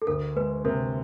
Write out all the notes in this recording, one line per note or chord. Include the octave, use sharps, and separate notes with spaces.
A4
D2 A#4
G#3 B4
C3 A#4